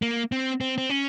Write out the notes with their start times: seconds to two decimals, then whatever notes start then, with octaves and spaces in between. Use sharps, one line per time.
0.02 A#3
0.32 C4
0.61 C4
0.78 C4
0.89 C#4